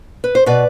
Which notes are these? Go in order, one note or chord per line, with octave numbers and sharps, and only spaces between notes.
B4
C5
B2 B4 D5